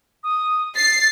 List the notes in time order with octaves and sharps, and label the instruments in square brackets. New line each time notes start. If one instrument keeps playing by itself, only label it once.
[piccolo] D#6
[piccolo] A6 [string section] C7